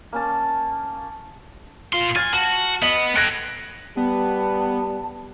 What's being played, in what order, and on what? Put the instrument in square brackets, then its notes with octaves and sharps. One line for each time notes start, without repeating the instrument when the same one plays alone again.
[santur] A#3 C#4 A5
[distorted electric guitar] A#2 C6 [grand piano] F4
[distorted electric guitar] G#5 [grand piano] F6 A6
[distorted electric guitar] F#4 [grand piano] A5
[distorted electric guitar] B3 [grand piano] D#5 F#7
[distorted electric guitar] A4 G5 [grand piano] F#6 G#6 A#6
[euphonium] G3 [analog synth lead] B3 [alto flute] A5